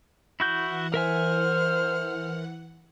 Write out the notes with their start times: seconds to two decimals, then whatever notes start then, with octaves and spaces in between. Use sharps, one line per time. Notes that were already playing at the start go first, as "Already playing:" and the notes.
0.40 E3 E4 F#4 F#5 G6
0.94 A#4 C5 E5 G#5 F6